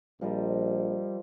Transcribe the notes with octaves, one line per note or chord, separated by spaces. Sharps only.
A#1 F3 G3 A#4 D#5